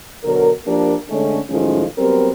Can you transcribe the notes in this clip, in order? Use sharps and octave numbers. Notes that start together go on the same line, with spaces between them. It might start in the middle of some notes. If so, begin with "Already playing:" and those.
B2 D3 F#3 A#4
F3 A#3 D4 G4 A#4
D3 G#3 A3 C#4
F#2 A2 D#3 F3 G#3 C#4
F#3 G3 B3 C4 G4 A#4